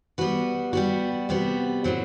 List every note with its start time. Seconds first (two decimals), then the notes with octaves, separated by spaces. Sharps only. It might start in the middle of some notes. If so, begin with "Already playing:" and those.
0.18 G3 B3 F#4 B4
0.73 G3 B3 F#4
1.29 C3 G3 B3 F#4
1.84 A2 F#3 C4